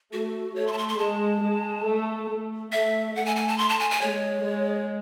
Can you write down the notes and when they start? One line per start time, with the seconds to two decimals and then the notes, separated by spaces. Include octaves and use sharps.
0.13 A3 F#4
0.56 A3 C#5
0.67 C6
0.73 A5
0.78 C6
0.89 C6
0.99 G#3 A5
1.43 G#3
1.86 A3
2.29 A3
2.72 A3 E5
3.16 A3 F#5
3.26 G#5
3.36 G#5
3.48 A5
3.58 C6
3.69 A5
3.79 G#5
3.91 G#5
4.01 G#3 C#5
4.44 G#3